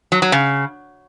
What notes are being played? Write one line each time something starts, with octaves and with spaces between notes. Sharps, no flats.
F#3
F#3
C#3